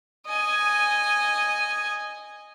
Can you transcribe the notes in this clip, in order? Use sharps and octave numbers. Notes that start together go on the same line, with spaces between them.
D#5 G#5